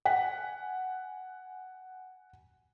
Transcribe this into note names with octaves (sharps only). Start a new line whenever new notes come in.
F#5 G#5 B6